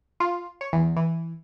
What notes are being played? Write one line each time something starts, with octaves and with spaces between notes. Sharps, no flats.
F4
C#5
E2
E3